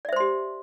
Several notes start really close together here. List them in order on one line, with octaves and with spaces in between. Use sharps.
D5 E5 C5 C6 G4